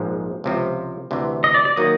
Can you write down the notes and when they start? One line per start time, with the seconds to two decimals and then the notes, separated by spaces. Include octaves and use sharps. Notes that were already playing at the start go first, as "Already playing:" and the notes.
Already playing: A#1 G#2 F3 G#3
0.44 C#2 C3 F3
1.11 D2 C3 E3
1.44 D#5
1.54 D5
1.65 D5
1.76 D#3 F#3 A#3 D#4 D#5